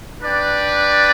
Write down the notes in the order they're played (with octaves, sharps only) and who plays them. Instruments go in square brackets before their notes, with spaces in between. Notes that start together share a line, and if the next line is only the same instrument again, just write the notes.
[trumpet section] D4 B4 D5 G5